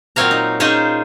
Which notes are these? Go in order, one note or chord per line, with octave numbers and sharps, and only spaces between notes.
A#2 F#3 C4 C#5 F5 A#5
D#4
C#4 D#4 F4 G#4 C5 C#5